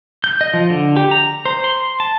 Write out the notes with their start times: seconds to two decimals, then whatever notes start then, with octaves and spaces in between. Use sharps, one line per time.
0.24 G6
0.41 D#5
0.54 F3
0.70 D3
0.97 G4
1.11 A#5
1.45 C5
1.64 C6
2.00 A5